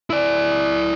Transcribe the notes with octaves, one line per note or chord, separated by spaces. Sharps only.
E4 D5